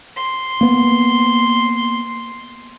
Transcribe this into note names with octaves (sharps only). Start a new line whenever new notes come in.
C6
A#3 B3